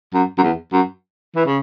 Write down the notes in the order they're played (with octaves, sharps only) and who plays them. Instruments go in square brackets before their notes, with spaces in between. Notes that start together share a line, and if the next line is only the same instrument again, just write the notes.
[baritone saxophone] F#2
F#2
E2
F#2
E3
C#3